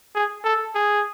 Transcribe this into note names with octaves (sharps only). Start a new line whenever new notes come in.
G#4
A4
G#4